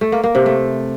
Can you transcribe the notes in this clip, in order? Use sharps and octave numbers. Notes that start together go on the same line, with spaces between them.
A3
A#3
A#3
C3
A3